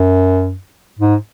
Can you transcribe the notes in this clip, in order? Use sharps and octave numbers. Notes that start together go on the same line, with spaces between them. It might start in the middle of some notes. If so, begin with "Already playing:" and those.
Already playing: F#2
G#2